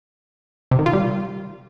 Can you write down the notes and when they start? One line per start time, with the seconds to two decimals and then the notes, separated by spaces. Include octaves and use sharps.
0.71 C3
0.79 D#3
0.86 F4
0.93 G3